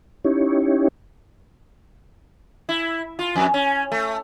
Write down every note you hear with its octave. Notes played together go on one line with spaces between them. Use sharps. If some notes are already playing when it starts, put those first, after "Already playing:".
C#4 D#4 E4 G4 C#5
E4
F4
F2
C#4
A3